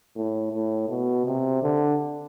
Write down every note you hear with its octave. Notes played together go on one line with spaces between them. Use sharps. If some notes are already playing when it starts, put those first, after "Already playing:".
A2
A2
B2
C3
D3